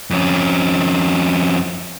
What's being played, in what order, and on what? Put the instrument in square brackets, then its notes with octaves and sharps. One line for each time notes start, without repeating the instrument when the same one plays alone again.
[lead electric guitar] F2 C#4